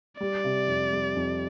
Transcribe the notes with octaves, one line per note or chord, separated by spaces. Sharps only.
G3 D5
C3
F2
G3
F2